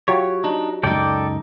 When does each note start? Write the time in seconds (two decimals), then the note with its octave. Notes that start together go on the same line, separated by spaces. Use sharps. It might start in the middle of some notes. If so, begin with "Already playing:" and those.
0.08 F#3 F4 G4 C#5
0.44 D4 D#4
0.83 C#2 F#2 D#4 A4 D5 G5